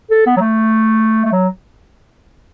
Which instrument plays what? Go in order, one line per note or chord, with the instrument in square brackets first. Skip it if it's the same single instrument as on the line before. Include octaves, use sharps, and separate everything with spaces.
[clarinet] A4
B3
F#3
A3
A3
F#3